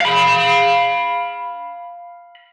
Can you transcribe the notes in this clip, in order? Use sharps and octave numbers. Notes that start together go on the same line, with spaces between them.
F5 B5